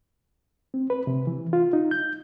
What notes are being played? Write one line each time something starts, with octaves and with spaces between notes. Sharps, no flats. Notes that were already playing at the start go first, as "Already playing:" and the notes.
C4
B4
C3
E3
F4
D#4
G6